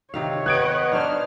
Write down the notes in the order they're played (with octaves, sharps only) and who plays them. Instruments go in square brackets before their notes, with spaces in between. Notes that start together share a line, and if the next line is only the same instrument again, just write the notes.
[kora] C3 D#3 F5 [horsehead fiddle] C#5
[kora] B3 [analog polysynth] B4 D#5 F#5 [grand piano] F#6 G#6 D7
[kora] D4 D#4 C5 [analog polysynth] F6